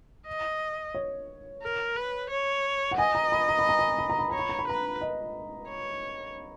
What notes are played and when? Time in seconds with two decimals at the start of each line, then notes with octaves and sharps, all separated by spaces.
0.27 D#5
0.94 C#5
1.62 A#4
1.96 B4
2.30 C#5
2.91 F#5
2.98 D#5 G#5
3.15 A#5
3.32 B5
3.49 A#5
3.59 B5
3.69 A#5
3.79 B5
3.90 A#5
3.99 B5
4.10 A#5
4.19 B5
4.30 C#5 A#5
4.39 B5
4.49 A#5
4.59 B5
4.68 B4 A#5
5.01 D#5
5.69 C#5